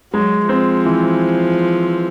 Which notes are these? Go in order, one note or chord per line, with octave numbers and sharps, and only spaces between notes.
F#3 G#3
F3 C4
E3